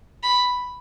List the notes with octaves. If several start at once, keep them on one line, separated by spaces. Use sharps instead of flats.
B5